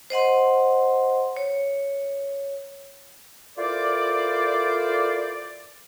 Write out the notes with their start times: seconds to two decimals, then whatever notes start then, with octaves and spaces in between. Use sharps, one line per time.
0.10 C5 D#5 F#5 C6
1.37 C#5
3.57 E4 F4 A4 A#4 C5 D5